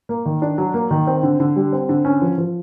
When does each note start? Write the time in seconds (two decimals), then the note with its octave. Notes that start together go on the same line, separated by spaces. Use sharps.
0.09 A#3
0.26 D#3
0.42 D4
0.58 F#3
0.74 A#3
0.91 D#3
1.07 C4
1.23 D3
1.40 D3
1.56 G3
1.73 C4
1.89 D3
2.05 C#4
2.22 F3
2.38 F3